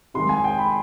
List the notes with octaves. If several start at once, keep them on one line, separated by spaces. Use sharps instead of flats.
C3 D#3 G#3 C6
G#5
G5
B5